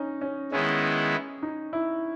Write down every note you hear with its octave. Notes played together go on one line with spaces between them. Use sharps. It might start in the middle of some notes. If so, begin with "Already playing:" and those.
Already playing: C#4 D#4
C#4
D#3 G#3 B3 C#4 E4
D#4
E4